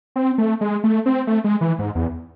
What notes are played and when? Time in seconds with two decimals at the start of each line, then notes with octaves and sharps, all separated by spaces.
0.16 C4
0.38 A3
0.61 G#3
0.84 A3
1.06 C4
1.27 A3
1.44 G#3
1.61 E3
1.79 G#2
1.95 E2